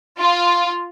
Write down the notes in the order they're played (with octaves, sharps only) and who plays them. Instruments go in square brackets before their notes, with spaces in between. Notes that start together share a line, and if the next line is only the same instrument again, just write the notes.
[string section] F4